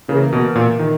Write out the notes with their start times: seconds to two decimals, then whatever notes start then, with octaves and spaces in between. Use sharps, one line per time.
0.08 C#3 E3 A#3 E4 A#4
0.33 B2
0.56 A#2
0.79 D#3